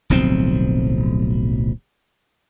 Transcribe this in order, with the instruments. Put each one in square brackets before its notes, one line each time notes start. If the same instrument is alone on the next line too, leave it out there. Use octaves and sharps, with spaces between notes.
[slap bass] D1 B1 F3 C4